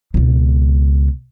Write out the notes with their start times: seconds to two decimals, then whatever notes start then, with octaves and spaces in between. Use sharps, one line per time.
0.14 C#2 B2